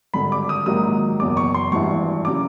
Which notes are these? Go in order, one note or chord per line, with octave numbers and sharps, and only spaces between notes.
G#1 G2 D3 B5
D6
D#6
A#1 G#2 D#3 F#3 D#6
F#1 E2 B2 F#3 D6
C#6
C6
G#1 G2 E3 C#6
C#3 F#3 D6